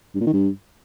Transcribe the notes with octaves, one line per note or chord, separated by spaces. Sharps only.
G2
A#2
D#3
G2